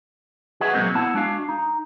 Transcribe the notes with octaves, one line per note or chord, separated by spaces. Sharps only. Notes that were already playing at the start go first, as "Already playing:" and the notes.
F#4 G#4 B4 D#5 E5 F#5
A#2 F#3 G#3 A#3 C4 F#4
B3 E4 F#5 A5
G#3 D4 F#4 F5
D#4